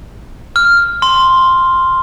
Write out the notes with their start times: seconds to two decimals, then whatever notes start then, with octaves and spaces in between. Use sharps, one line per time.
0.56 F6
1.02 C6